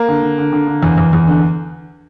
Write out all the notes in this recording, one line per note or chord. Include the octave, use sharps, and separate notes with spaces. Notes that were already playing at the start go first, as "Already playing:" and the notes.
Already playing: A#3
D3
D3
D3
D3
D3
E2
E2
E2
D3